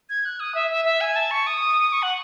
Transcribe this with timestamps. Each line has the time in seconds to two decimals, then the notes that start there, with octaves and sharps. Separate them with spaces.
0.10 G#6
0.25 F#6
0.40 D#6
0.55 E5
0.71 E5
0.85 E5
1.01 G#5
1.16 A5
1.31 C#6
1.47 D#6
1.93 C#6
2.03 F#5